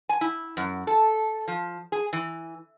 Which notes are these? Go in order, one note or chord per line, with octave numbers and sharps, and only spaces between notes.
G#5
E4
F#2
A4
F3
G#4
E3